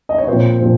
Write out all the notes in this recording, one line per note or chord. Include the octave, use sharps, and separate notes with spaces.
D#5
C#5
A#2 F3 C4 C5
A#2 F3 C4